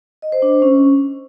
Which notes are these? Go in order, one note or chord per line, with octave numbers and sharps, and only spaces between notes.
D#5
C5
D4
C5
C#4